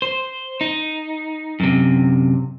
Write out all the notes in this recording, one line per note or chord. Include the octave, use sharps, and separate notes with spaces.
C5
D#4
F#2 C3